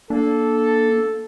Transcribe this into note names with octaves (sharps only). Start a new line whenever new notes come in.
A#3 D4 A4